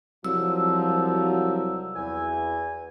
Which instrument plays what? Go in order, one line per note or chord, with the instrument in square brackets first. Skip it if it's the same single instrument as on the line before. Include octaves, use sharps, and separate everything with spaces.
[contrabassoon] C2 [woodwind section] F3 [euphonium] F#3 [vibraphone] E6
[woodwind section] E2 G#5